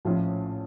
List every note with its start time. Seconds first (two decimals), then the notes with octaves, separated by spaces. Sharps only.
0.05 A#1 A2 F3 C#4 F4